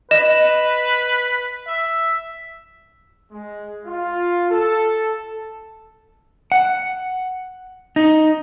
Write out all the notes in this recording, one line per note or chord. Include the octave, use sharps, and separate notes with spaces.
B4 D#5 E7
E5
G#3
F4
A4
F#5
D#4